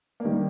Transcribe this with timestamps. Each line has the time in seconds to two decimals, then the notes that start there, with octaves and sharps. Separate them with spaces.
0.20 A#3
0.25 D#3 G3